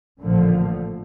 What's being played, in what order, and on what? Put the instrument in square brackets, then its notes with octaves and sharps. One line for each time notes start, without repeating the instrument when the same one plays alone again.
[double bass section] A1 A#2 D3 F3 A3